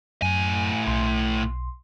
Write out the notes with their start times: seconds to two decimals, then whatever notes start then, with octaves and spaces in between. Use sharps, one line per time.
0.22 F#2 A2 G#5
0.87 B1 C6